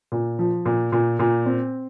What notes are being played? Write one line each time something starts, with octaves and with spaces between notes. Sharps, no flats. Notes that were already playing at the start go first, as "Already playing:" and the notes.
A#2
F3
A#2
A#2
A#2
C4